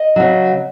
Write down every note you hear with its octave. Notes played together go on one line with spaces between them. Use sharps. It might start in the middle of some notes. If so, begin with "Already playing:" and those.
Already playing: D#5
C#3 F#3